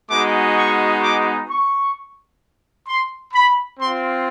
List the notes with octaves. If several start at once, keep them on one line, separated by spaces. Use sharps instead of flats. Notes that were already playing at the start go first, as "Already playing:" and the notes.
G#3 B3 D#4 F#4 D6
C#6
D6
C#6
C6
B5
C4 F4 C6